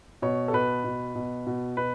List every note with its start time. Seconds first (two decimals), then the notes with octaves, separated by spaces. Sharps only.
0.22 B2 C#5
0.48 A4
0.53 B2 B4
0.84 B2
1.15 B2
1.47 B2
1.77 B2 B4